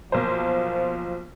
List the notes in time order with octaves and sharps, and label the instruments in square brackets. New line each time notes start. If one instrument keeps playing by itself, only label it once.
[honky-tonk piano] B1 A#3 C5 [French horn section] F3